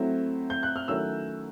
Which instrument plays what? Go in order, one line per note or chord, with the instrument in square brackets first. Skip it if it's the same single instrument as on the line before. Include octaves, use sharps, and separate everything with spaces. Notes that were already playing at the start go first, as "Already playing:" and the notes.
Already playing: [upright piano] F#3 A3 C4 E4
G6
F#6
F6
D#3 F#3 A3 C#4 E4 E6